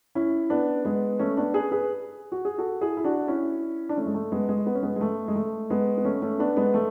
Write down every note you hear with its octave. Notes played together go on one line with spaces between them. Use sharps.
C#4 E4
B3 D4
G#3 B3
A3 C#4
B3 D4
G#4 B4
G#4 B4
F#4
G#4
F#4 A4
E4 G#4
E4
D4 F#4
C#4 E4
D4
A3 C#4
G#3
A3
G#3 B3
G#3
B3
C#4
G#3 B3
G#3
A3
G#3
A3
G#3 B3
B3
A3 C#4
A3 C#4
B3 D4
G#3 B3
A3